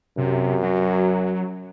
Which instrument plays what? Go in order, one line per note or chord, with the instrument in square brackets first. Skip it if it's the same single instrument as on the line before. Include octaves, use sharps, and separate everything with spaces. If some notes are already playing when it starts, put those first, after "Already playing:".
[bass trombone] F#2 [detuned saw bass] C3
[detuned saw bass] F#3